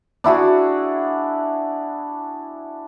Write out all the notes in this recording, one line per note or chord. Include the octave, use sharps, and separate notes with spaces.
D4 E4 F#4 G#4